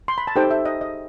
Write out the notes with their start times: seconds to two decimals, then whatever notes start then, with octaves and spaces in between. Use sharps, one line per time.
0.08 C6
0.18 B5
0.27 A5
0.36 D#4 G4 A4 C5 G5
0.51 E5
0.66 D#5
0.81 D#5